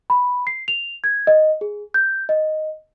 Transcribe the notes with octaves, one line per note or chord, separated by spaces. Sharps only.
B5
C7
F7
G#6
D#5
G#4
G6
D#5